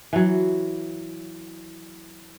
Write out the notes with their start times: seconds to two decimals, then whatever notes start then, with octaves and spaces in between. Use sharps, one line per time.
0.13 E3 F#3